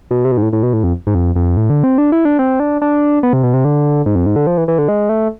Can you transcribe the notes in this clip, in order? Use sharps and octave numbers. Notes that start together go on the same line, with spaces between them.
B2
C3
B2
G#2
A2
A2
B2
A2
F2
G#2
F2
F2
A2
D3
C4
D4
E4
D4
C4
D4
D4
B3
C3
B2
C3
D3
G#2
F2
G#2
D3
F3
E3
E3
D3
G#3
A3